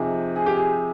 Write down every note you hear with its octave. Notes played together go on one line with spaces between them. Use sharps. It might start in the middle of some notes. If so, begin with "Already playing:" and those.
Already playing: F2 C3 F3 C4 D#4 G#4
G#4
G4
G#4